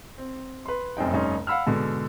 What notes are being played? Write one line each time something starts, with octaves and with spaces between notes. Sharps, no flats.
C4
B4 C6
F1 F#2 C4 D#4 G5
F1 G2 C#4 D#4 C6
F5 F#5 B5 E6 F6
G#2 B2 D3